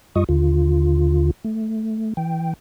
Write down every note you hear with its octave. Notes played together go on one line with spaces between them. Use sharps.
F#2 G3 F4 D#5 C#6 D#6
D#2 D3 F4
A3
E3 G5